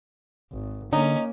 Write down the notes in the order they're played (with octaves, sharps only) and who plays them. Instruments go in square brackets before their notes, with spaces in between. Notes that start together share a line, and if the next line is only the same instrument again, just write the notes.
[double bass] G#1
[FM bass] D3 [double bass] A#3 [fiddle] C#4 [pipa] D#4